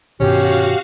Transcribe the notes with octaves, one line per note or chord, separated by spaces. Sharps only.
G2 B2 D#3 C#4 F#4 G4 F5